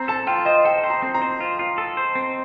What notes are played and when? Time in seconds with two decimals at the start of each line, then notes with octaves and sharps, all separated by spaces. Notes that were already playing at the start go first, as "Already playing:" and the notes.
Already playing: C4 A#5
0.08 A4 A5
0.27 F4 G5
0.45 C5 D#5
0.65 A4 G5
0.84 C5
0.90 A#5
1.02 C4
1.15 A#5
1.22 C5
1.41 F4
1.59 F4
1.78 A4
1.97 C5
2.15 C4